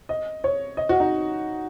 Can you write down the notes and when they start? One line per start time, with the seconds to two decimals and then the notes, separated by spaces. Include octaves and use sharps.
0.09 D#5
0.44 C#5
0.77 D#5
0.89 F#4
1.00 D#4